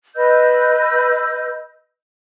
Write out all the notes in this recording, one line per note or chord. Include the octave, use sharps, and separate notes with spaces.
B4 D#5 E6 G6